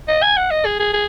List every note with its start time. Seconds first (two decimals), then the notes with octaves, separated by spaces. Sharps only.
0.08 D#5
0.22 G#5
0.37 F#5
0.51 D#5
0.65 G#4
0.79 G#4
0.93 G#4